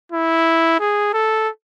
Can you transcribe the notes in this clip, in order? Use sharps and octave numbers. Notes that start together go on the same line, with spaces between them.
E4
G#4
A4